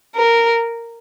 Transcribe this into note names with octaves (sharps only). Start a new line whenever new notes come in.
A#4